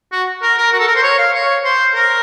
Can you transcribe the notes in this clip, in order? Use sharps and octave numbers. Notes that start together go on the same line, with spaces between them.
F#4
A#4
A#4
F#4
A4
A#4
C5
C#5
F5
C#5
C5
A#4